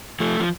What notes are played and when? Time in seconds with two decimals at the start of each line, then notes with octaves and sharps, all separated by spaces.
0.20 F3 A3
0.40 F3